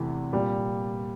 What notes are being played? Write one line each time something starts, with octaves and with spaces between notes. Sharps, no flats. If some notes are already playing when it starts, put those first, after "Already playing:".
Already playing: E2 C3 E3 A3
A#2 G3